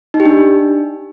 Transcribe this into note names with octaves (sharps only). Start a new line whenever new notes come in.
D#4
G4
D4